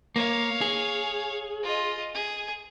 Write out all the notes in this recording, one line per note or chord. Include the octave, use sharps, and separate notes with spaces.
A#3 C#5 F5
G#4
F4 D#5
G#4